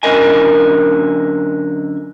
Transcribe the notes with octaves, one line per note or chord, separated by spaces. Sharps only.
F#2 D3 A#4 D#5 G#5